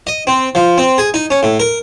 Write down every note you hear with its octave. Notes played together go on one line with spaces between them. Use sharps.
D#5
C4
F3
C4
G#4
D#4
C#4
A2
A#4